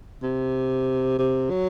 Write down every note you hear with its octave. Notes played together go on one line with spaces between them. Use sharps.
C3
C3
F#3